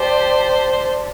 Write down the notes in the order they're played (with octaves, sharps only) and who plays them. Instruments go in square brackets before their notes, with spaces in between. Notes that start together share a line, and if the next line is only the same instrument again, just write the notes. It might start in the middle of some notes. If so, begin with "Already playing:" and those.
Already playing: [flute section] G4 D5 A5 C6 [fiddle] C5